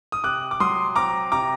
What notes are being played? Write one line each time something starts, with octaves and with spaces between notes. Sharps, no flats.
D#6
C3 D6 F#6
D6
F#3 C6 D#6
C4 A#5 D6
C3 A#5 D6